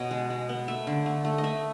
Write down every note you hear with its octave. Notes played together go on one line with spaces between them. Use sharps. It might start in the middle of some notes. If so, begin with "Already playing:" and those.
Already playing: B2 B3 C#5 D#5
G#3
G#3
B3
A3 E5
D3
A3
A3
D#5
A3 E5